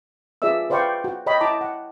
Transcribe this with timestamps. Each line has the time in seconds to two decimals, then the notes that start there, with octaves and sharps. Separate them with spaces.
0.42 F4 G#4 B4 D5 E5 E6
0.70 B4 C5 D5 F5 G5 C#6
1.04 F#4
1.26 C#5 D#5 G5 B5
1.41 E4 A5 A#5 D6
1.61 F#5